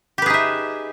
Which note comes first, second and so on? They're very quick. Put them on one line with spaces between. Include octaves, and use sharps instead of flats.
G4 B4 G#4 D#4 E5